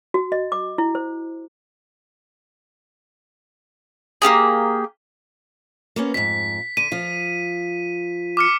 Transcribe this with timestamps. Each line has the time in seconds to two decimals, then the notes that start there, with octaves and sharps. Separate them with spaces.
0.14 F#4
0.32 D#5
0.52 D6
0.78 E4
0.95 C5
4.22 A#3 C#4 G4 G#4
5.96 A#3 B3 C#4
6.14 F2 G#2 B6
6.77 D3 D#7
6.92 F3 F4
8.37 D6 F6 C#7